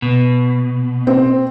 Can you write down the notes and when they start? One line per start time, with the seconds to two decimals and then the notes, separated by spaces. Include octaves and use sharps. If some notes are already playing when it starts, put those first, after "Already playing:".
0.02 B2
1.07 C4